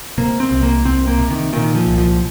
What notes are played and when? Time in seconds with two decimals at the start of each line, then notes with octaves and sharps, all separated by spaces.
0.18 C3 A#3
0.40 C4
0.51 C2
0.63 A#3
0.85 C2 C4
1.07 A#3
1.19 C3
1.30 D#3
1.53 A#2 D#3
1.75 F3
1.87 C2
1.98 F3